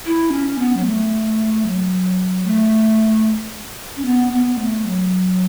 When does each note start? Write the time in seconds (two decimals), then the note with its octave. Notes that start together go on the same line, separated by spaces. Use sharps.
0.06 E4
0.32 C#4
0.58 B3
0.76 F#3
0.85 A3
1.66 F#3
2.46 A3
3.96 C#4
4.05 B3
4.32 B3
4.58 A3
4.86 F#3